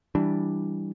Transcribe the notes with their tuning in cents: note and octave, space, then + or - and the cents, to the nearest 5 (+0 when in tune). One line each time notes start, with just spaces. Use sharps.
E3 -5 G3 +0 D4 +0